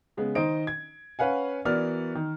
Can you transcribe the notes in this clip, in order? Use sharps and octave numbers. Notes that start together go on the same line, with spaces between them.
C#3 G#3 B3
D#3 D#4 C5 D#5 D7
G#6
C#4 B4 F5 F#5 G#5
E3 B3 F#4 A#4 D5 F6
D#3